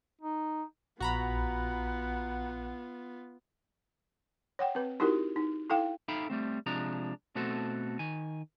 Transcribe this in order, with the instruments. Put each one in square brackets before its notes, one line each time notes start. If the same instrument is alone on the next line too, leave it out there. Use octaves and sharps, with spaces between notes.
[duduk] D#4
[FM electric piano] A#1 [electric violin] B3 F4 [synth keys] F#4 A#5 B5 [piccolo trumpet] F#5
[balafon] C#5 F#5 G5
C4 B4
D#4 E4 F#4 G4 A#4
D#4
E4 A4 F5 G5
[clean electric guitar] D#4 A4 E5 F5 G5 B5
G3 A3 C4
C3 F3 G#3 D4 A#5
B2 A3 C4 F#4 A4
D#3 G#5